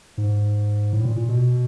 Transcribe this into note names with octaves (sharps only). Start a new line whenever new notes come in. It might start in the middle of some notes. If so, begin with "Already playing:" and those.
G#2
A2
A#2
A#2
B2